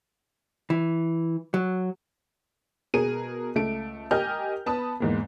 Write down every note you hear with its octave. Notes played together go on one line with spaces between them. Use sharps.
E3
F#3
B2 G#4 A#4 D#7
C#2 A3 D7
G4 A#4 D#5 G#5 F6 G6
B3 A5 B5 D#6
E2 G#2 A#3